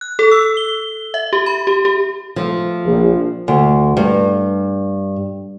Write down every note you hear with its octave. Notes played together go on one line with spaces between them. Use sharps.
F#6
A4
E6
G7
E5
G4
B5
G4
G4
F3 A3
A#1
D2
G2